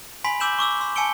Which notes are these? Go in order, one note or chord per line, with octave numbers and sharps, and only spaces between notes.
G#5 B5 C6 B6
G#5 D6 E6 G6 E7 F#7
C#6 D6 E6
C6 E6
G#5 A5 E6 C#7 D7 G7